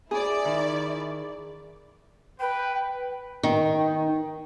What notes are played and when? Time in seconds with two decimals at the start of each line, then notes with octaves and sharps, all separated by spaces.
0.11 E4 G#4 D5
0.45 D#3
2.40 B4 G5
3.43 D#3